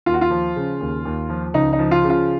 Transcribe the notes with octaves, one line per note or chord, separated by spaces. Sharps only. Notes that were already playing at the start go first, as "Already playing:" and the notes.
D#2 F4
F#4
F4
F3
C#3
D#2
D#2
F3
C#2 D#4
D#4
F3
F4
C#3
F4